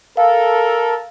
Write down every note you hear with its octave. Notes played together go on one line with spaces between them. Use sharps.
A4 A#4 F5